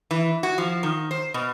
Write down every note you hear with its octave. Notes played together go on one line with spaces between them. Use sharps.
E3
F#4
F3
D#3
C5
B2